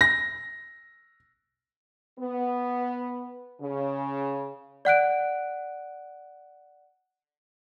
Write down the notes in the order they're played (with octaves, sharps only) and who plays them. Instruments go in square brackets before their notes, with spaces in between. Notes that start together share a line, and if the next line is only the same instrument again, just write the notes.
[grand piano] A#6
[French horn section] B3
C#3
[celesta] D5 F#5 F#6 D7